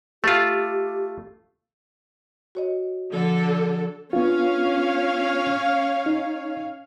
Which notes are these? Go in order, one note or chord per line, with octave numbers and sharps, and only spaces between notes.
A3 F4 G4
F#4 C#5 D#5
D3 F3 A4
B3 C#4 D4 F4 C#5 F5
D#4